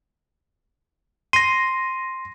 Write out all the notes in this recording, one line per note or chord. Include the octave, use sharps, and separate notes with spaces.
C6 A#6 D#7